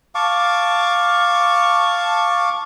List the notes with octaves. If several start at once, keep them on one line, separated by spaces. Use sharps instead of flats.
F5 A5 C#6 D6